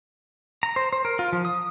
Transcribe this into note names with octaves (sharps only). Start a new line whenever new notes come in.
A#5
C5
C5
A#4
F4
F3
D#6